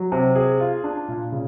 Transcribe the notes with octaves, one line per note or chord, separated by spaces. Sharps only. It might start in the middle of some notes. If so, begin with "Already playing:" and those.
Already playing: F#3
C3
G#4
F4
D4
A#2
C#3